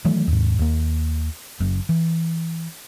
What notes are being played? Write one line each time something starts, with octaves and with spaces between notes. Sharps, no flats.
D#3 E3 F#3 A3
D#2 G#2
D#2 A#3
F#1 F#2
E3